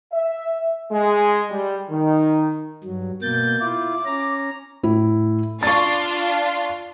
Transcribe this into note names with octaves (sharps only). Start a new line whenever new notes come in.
E5
G#3
G3
D#3
G2 F#3
B2 A#3 G6 A6
E4 F4 D6
C#4 A#5
A2 E4
D4 F4 C#6 A6